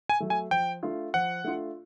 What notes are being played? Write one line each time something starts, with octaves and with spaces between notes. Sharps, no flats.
G#5
F#3 A3
G#5
F3 G5
A3 D4 F4
F3 F#5
A3 D4 F4